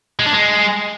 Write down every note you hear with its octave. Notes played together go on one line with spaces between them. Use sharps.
G#3
D4
G#3